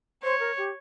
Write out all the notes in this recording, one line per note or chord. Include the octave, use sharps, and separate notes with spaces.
C5 C#5
A#4
G4